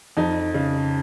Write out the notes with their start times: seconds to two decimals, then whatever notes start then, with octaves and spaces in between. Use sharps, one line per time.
0.17 F2 D#4
0.54 C#3